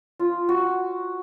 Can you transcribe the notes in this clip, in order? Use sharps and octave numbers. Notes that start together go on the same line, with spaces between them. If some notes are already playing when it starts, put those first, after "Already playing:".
F4
F#4